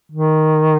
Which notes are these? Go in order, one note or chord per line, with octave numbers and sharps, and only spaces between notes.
D#3